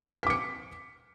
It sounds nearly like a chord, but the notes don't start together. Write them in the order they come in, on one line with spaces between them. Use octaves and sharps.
B6 D6 C#7